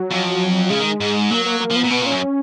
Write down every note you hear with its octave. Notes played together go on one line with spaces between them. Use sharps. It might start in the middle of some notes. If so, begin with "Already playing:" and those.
Already playing: F#3
F2
C#3 G#3
D#3
G#2
F#3 A#3
A#3
A#3
F3
B3
A#2
B2 B3
A#2 C#4
F#2